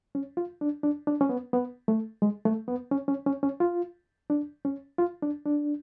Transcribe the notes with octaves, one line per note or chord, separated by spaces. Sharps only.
C#4
F4
D4
D4
D4
C#4
B3
B3
A3
G#3
A3
B3
C#4
C#4
C#4
C#4
F4
D4
C#4
F4
D4
D4